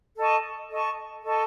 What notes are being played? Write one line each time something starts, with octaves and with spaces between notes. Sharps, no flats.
A4 D#5 A5 C#6
A4 D#5 A5 C#6
A4 D#5 A5 C#6